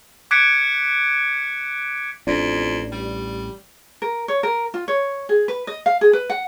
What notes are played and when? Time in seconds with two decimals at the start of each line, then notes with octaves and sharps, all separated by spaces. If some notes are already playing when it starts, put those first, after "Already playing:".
0.31 D6 F#6 G#6 B6 C#7 D7
2.27 A1 F2 D4
2.92 G3
4.02 A#4
4.28 C#5
4.43 A#4
4.74 F4
4.88 C#5
5.29 G#4
5.48 B4
5.67 D#5
5.86 F5
6.01 G#4
6.13 B4
6.30 F#5